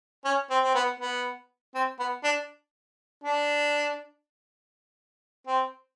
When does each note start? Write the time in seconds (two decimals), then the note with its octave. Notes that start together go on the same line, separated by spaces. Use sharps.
0.25 C#4
0.50 C4
0.63 C4
0.74 B3
1.00 B3
1.74 C4
1.99 B3
2.24 D4
3.24 D4
5.47 C4